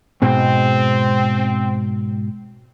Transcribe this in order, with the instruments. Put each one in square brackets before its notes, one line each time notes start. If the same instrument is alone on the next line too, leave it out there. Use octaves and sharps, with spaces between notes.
[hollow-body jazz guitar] G#2 B2 G#3 [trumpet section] C4